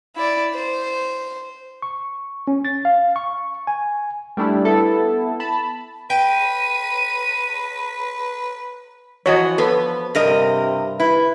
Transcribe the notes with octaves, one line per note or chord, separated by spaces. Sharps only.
E4 D5
C5
C#6
C#4
A6
F5
C#6
G#5
G3 A3 D4 E4
B3 E4 A4
A5 B5
B4 G5 D#7
E3 F3 F#4 C#5 D#5
B3 A4 B4
G2 C3 A#4 D#5
E4 B4